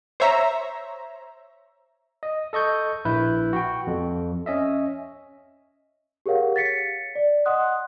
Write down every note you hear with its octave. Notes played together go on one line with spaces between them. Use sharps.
C5 C#5 E5 A#5
D#5
A4 D#5 C#6 G6
A#1 E4 B4 G6
F#4 G5
F2
C#4 D#5 E5
G4 G#4 A#4 C#5 F5 F#5
A6 B6 C#7
D5
D#5 F#5 C6 D#6 F#6